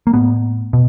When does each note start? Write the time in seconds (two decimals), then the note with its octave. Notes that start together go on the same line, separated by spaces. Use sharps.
0.07 A#3
0.13 A2 B3
0.73 B2